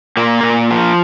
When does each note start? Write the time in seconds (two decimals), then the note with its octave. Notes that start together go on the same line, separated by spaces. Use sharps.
0.17 A#2 A#3
0.43 A#2
0.71 F3